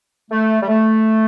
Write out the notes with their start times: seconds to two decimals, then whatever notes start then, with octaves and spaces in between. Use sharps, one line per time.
0.30 A3
0.61 G3
0.68 A3